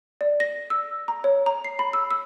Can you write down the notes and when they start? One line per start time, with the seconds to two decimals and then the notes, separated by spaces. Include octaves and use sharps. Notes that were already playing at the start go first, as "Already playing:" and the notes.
0.21 D5
0.40 A#6
0.70 E6
1.08 A#5
1.24 C#5
1.46 A#5
1.64 C7
1.79 B5
1.93 E6
2.11 E6